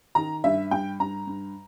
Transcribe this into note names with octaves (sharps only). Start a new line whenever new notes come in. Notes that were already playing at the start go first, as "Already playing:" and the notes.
D#3 A#5
G2 E5
G2 G5
G2 A#5
G2